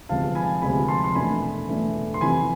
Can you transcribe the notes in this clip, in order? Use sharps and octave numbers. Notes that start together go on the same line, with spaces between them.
D2 C3 F3 G#3 B3 F5 A5
G#5 B5
D2 C3 F3 G#3 B3 G#5 B5
A5 C6
C6
E2 B2 A3 D4 G#5 B5
E2 B2 A3 D4
C6
F2 C3 E3 G#5 B5